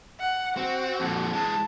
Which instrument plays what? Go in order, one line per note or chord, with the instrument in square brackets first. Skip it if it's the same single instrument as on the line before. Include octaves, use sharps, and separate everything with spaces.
[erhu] F#5
[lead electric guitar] C4 [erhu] F#4
[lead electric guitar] F2 A#2
[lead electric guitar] E3 G#3 [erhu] A5